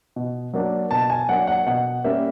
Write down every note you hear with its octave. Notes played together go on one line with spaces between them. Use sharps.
B2
F#3 A#3 D4
B2 A5
G#5
F#3 A#3 D4 F#5
F#5
B2 F#5
G3 A#3 C#4 E5